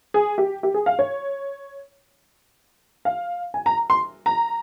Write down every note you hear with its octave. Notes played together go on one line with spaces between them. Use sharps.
G#4
G4
G4
G#4
F5
C#5
F5
G#5
A#5
C6
A#5